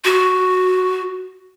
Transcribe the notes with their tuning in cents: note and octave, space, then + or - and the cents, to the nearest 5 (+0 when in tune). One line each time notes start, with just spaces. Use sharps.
F#4 +0